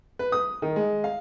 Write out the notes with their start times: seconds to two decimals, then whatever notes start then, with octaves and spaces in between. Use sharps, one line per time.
0.19 B4
0.32 D#6
0.62 D#3
0.76 G#3
1.04 F5